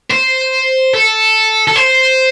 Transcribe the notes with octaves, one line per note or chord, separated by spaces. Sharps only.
C5
A4
A4
C5